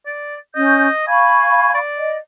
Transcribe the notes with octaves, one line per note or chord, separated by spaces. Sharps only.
D5
C#4 D#5 G6
F5 G#5 B5 C#6
D5
D#5